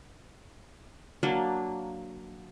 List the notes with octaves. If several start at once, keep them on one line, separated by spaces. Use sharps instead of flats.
F#3 A#3 D4